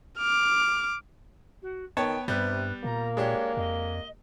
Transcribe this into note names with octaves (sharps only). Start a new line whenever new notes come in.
D6 F6
F#4
D#3 B3 C#5 G5 A5
G2 C3 G3 B3 B4
A#2 A#3 A#5
G#3 D4 G4 C#5
F2 D#5